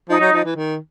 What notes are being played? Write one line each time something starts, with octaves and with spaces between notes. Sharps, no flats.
F3 D#4
F#3
F3
E3
D#3